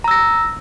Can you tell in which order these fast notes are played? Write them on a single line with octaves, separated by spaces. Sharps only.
A#5 E6 A#6